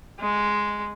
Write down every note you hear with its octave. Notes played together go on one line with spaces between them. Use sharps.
G#3